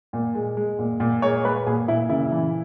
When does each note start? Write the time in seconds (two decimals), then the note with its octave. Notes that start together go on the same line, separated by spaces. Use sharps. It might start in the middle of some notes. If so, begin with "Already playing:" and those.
0.13 A#2
0.35 G#3
0.57 G#3
0.79 A#2
1.00 A#2
1.22 G#3 C#5
1.44 G#3 B4
1.66 A#2 G#4
1.88 A#2 E4
2.10 C#3 E4
2.32 E3